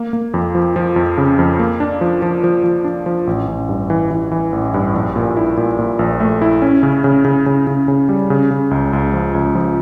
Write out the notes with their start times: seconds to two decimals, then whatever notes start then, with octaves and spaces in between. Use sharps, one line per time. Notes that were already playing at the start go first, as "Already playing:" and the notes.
Already playing: A#3
0.13 A#3
0.34 F2
0.55 F3
0.76 F3
0.96 F2
1.18 C#3
1.39 F2
1.59 A#3
1.80 D4
2.01 F3
2.22 F3
2.44 F3
2.64 F3
2.84 D4
3.06 F3
3.27 A1
3.48 A1
3.69 G2
3.90 E3
4.11 E3
4.31 E3
4.52 A1
4.74 G2
4.94 A#1
5.16 A#2
5.37 E4
5.57 A#2
5.79 A#2
5.99 A#1
6.20 A3
6.42 E4
6.62 C#4
6.83 C#3
7.04 C#3
7.25 C#3
7.46 C#3
7.67 C#3
7.88 C#3
8.09 G3
8.30 C#3
8.51 C#3
8.71 C#2
8.93 C#2
9.14 F3
9.35 C#2
9.55 F3